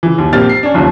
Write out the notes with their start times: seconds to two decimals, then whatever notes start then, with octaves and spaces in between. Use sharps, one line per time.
0.03 C#3 E3
0.18 D#2
0.33 A#1 A#3 C4 G4 F6 A6
0.50 C7
0.63 C#4 D4
0.74 F#1 D#2 F3